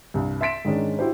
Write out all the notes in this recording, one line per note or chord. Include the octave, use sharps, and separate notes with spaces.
C2 G2
E5 C6 A6 B6 D7 E7
G#2 D#3 G#3 C#4 D4
E4 F#4 G4 C5